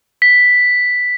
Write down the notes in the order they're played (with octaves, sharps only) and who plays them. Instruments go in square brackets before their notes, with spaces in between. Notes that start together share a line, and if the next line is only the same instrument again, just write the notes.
[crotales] B6